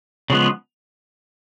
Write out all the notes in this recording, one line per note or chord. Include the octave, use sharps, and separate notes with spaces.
C#3 F3 G#3 B3